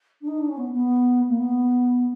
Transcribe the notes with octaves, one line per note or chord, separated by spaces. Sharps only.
D4
D#4
D4
C#4
B3
B3
A#3
B3